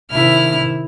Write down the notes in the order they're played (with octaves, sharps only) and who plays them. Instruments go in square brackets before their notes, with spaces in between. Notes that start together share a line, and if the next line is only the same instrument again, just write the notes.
[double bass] C3 D#3 [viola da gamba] E4 [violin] F6